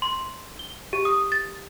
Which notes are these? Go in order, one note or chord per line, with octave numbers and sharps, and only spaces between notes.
C6
G7
G4
D#6
A6